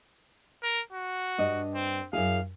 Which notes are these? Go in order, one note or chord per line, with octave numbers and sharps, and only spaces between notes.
A#4
F#4
G2 D4 D#5
C4
F#2 E4 G#4 F5